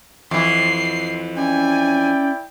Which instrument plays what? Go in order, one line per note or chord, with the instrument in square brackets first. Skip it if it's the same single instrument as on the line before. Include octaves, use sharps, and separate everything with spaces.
[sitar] F2 E3 [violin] C7
[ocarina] C#4 [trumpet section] E4 D5 G5 [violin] G#5